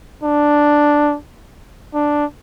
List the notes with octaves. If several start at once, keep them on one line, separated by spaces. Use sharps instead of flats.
D4
D4